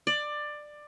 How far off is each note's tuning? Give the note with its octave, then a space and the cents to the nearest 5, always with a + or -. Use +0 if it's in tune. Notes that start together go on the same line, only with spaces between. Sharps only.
D5 +15